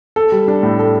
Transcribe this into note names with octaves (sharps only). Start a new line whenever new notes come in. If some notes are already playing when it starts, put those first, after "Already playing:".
A4
G3
D4
A2
A4